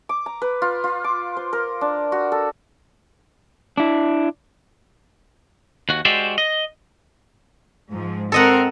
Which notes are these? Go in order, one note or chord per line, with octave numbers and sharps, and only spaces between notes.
D6
A#5
B4
F4
F4
D6
C5
A#4
D4
F#4
A4
D4 E4
D#2 F#4
G#3 F#4 G4 C5 D5 E5
D#5
G#2 F3
C4 A4 A#4 D#5 F#5